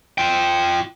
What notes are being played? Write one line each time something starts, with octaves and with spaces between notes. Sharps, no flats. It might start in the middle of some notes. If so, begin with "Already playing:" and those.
F4 G5